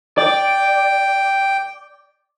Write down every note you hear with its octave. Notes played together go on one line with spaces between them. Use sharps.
D5 G5